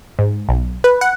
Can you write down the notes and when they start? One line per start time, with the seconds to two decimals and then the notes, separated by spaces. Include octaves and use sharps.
0.19 G#2
0.49 B1
0.84 B4
1.01 F#5